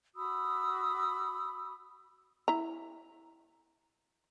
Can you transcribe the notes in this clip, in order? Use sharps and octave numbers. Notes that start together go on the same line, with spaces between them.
F#4 B5 D#6 E6
E4 A#5